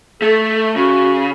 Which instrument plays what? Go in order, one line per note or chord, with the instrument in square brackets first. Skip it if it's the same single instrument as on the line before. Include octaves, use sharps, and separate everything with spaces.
[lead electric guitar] A3 [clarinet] A4
[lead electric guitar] C#3 [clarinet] F#4